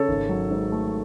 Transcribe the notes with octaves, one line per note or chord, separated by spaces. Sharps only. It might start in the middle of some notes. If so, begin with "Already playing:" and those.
Already playing: C#3 A4 C#5
G#1
F#3
G#2
A3